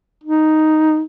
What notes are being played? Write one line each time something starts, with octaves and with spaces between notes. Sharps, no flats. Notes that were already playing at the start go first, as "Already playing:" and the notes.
D#4